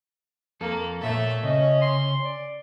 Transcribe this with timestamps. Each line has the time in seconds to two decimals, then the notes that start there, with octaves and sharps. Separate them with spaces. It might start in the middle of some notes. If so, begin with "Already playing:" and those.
0.61 F2 A#3 A4
1.01 A#2 A3 A4 C#5 E5
1.43 C#3 C#4 D#5
1.82 C6
2.23 D5